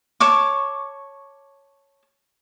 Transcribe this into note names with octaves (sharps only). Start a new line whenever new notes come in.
C#5 A5 C#6 D6